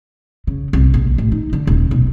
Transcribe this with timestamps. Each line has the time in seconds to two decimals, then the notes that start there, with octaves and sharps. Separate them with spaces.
0.47 C#3
0.73 C2
0.94 A#1
1.18 A1
1.32 D#4
1.53 D3
1.67 D#1
1.91 B1